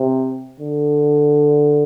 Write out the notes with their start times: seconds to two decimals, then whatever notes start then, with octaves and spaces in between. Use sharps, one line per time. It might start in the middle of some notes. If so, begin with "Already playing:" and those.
Already playing: C3
0.60 D3